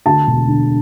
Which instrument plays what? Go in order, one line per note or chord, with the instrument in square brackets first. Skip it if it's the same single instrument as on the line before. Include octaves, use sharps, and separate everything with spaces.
[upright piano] D2 A5
E1
D3